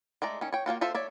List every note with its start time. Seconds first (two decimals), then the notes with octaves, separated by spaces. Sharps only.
0.22 G#3 A3 D5 A#5
0.41 D#3 C#4
0.53 C#5 G5
0.66 A#3 C#4 F4 F#4
0.81 F4 A4 C5 E5
0.95 C#5 D5 E5